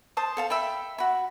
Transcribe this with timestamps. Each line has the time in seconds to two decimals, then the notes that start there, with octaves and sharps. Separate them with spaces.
0.17 C5 A5 D#6
0.37 A4 F5 A5
0.50 E5 G5 B5
0.98 F#4 B5